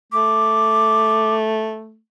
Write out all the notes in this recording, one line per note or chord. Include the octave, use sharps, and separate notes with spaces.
A3 D6